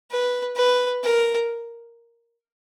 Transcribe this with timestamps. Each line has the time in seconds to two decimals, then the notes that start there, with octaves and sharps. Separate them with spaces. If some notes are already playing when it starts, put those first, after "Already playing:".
0.11 B4
0.56 B4
1.04 A#4